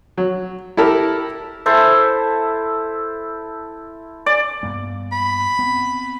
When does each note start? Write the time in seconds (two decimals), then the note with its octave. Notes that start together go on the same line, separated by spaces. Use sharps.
0.18 F#3
0.77 E4 G4 A4 A#4
1.66 E4 A4 C5 E5
4.26 D5
4.63 G2 A#3 B3
5.12 B5
5.59 B3 C4